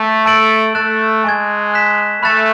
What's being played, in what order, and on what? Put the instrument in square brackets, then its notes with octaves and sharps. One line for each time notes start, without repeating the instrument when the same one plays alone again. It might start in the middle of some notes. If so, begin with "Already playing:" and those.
Already playing: [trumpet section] A3
[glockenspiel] A5 E6 A6 D7 F#7
[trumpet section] A3 [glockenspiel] F#6 A6 E7
[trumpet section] G#3 [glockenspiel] G#5 C#6 G#6
[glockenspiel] F#6 B6 E7
[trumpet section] A3 [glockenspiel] B5 F#6 A6 E7